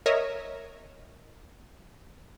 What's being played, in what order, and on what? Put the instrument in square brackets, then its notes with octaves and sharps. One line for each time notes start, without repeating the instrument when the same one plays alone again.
[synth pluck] A#4 C#5 D#5 E5